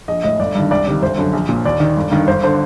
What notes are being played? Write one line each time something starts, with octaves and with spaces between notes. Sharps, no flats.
A#1 D#5
A2 D#5
G1 D5
G2 D#3
C2 D5
C3 D#3 D5
G1 C5
F#2 D3
A#1
A#2
D#2 D5
D#3
G1
G2 D#3
G1 C5
D3 C5